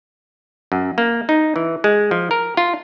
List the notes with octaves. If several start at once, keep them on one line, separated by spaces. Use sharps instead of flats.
F#2
A#3
D#4
E3
G#3
F3
A#4
F4